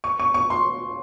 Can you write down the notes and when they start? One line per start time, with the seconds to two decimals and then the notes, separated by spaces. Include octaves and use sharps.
0.04 C#6
0.20 C#6
0.34 C#6
0.50 C6